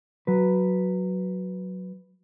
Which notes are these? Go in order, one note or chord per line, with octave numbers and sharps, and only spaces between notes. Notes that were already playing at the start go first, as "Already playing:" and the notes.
F#3 B4